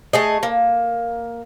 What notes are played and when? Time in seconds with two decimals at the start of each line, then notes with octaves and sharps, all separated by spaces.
0.13 A3 G#4 D#5
0.43 A#3